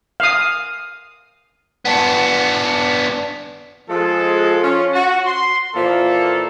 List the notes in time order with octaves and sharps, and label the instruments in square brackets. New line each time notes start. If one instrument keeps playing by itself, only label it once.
[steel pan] F5 D#6
[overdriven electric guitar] B3 D4
[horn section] F3 G#3 A4
C#4 F4
F#4
C6
A#2 E3 F3 A#3 F4 A4